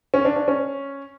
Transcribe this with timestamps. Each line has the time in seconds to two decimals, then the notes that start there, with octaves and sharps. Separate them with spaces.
0.14 C#4
0.25 D4
0.36 D4
0.48 C#4